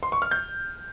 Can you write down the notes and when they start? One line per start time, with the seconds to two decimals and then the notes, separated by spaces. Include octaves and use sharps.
0.03 C6
0.12 C#6
0.22 F6
0.31 G6